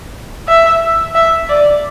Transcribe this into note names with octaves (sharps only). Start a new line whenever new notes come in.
E5
E5
D5